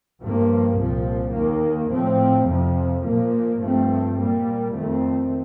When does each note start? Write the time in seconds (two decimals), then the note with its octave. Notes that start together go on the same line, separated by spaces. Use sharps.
0.21 G2 F3 A#3
0.78 C2 A#2 F3
1.34 D#2 D#3 A#3
1.92 A2 F3 C4
2.48 F2 C3 F3
3.04 A#2 F3 A#3
3.61 G2 F3 A3 C4
4.18 A#2 G3 A#3
4.75 F2 D#3 A3 C4